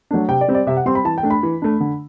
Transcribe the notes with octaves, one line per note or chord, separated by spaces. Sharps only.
F#3 A3 D4
C3 G5
D5
G3 C4
D5
C3 E5
F#5
G3 C4 C6
B5
E3 A5
G5
A3 D4
B5
E3
A3 D4
D3